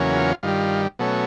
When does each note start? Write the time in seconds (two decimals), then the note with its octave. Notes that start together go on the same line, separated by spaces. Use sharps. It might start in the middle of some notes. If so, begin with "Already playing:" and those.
Already playing: E2 C#3 F#3 A#3 C#4
0.16 F4
0.43 G2 D#3 G3 F4
0.99 B2 F#3 A3 C#4